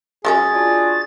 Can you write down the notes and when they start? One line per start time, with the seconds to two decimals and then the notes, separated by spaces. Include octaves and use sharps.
0.25 F#3 G#3 C#4 G#4 A6
0.55 D4 F4 F#4